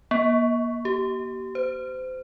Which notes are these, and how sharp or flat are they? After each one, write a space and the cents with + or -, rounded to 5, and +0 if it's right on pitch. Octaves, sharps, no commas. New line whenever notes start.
A#3 +35
G4 -35
C5 -35